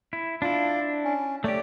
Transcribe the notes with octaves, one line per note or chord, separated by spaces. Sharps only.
E4
D4 E4 F4
C#4
A3 G4 C#5 D5